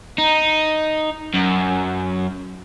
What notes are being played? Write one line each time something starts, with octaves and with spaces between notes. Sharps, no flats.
D#4
F#2